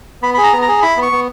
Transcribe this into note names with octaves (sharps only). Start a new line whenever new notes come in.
B3 B5
G#4 B5
A#5
B3
A#5
G#4
E4 B5
B3
C#6
B3